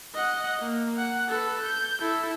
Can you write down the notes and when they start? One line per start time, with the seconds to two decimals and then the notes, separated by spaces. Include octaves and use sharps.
0.15 D#5 F#5
0.60 A#3
0.98 F#5
1.29 A4 B4
1.62 G6
2.01 E4 A4